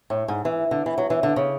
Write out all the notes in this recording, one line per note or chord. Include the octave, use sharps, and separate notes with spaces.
A2
G#2
E3
D3
E3
F#3
E3
D3
C#3